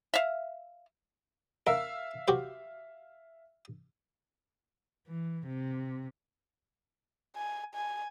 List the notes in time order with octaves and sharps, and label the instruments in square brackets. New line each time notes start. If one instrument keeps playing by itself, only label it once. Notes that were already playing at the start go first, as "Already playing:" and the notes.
[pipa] E5 F5
[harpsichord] A#4 [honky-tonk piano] E5 F5 E6
[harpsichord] F#4 G4 C5
[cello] E3
C3
[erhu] G#5
G#5